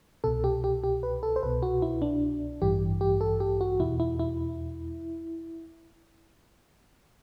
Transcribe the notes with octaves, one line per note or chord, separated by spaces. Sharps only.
C2 B2 A4
G4
G4
G4
B4
A4
C5
C2 B2 B4
F#4
E4
D4
A1 G2 E3 G4
G4
A4
G4
F#4
E2 B2 E4
E4
E4